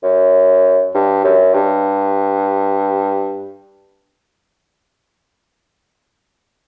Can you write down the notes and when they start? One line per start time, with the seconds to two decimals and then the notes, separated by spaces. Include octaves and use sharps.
0.03 F#2
0.94 G2
1.24 F#2
1.54 G2